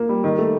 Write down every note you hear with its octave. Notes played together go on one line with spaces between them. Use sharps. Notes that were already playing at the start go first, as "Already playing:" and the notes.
Already playing: A#3
G3
D#3
A3